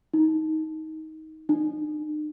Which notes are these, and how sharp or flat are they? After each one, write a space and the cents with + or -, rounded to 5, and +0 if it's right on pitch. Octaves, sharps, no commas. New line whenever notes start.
D#4 +20
D#4 -40